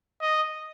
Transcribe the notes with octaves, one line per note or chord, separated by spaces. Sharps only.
D#5